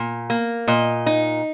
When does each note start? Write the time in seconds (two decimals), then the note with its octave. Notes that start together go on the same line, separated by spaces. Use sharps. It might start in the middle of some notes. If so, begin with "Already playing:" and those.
Already playing: A#2
0.30 A#3
0.68 A#2 D#5
1.06 D#4